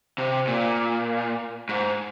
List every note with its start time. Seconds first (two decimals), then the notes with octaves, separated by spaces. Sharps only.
0.18 C3
0.47 A#2
1.69 G#2